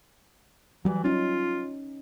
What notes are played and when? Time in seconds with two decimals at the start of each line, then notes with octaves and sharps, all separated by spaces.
0.85 E3 F#3 G3
1.04 C#4 D#4 F4